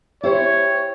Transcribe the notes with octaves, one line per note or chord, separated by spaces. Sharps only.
E4 G4 C5 C#5